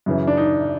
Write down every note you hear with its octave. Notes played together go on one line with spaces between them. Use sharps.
F#2 C#3 E3
D4
D#4